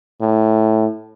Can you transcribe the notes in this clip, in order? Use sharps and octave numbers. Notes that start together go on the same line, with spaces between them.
A2